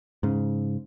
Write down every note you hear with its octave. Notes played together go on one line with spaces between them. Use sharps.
G#2 C#3